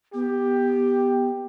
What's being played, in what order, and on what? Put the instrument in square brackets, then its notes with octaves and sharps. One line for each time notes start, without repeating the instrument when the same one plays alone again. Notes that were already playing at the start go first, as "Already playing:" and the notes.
[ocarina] B3 [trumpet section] G4